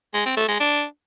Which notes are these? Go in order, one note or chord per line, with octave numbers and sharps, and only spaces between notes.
G#3
C4
A3
G#3
D4